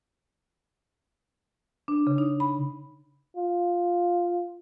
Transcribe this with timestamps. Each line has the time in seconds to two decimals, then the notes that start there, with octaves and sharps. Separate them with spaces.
1.88 D4
2.07 C#3
2.18 D#4
2.40 B5
3.37 F4